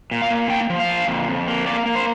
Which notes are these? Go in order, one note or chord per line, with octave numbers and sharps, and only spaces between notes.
A#2
F5
A#3
A#3 G5
F3
F5
A#2
F2
F2
A#3
A#3 D5
A#3
C5